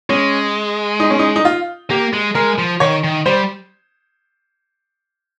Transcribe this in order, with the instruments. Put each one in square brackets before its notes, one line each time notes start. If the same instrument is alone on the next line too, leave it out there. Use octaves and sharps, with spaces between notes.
[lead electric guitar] G#3 [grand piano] C#4
[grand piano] D#4
C#4
D#4
D#4
F4
[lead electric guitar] A#3 [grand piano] G4
[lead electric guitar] G#3
[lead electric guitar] G#3 [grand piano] A#4
[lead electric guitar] F3
[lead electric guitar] D#3 [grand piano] C#5
[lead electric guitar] D#3
[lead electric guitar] G3 [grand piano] C5